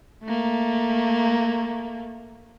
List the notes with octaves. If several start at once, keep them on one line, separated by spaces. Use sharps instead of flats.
A3 A#3